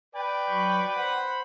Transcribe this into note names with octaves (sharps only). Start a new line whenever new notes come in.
B4 D5 G5
F#3 B5 C#6
C5 F#5 B5